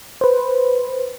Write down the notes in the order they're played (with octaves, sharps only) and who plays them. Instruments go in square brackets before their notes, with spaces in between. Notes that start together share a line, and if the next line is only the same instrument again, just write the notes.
[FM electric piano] B4 C5